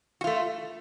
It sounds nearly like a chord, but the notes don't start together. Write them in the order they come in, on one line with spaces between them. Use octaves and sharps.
F#4 F4 A3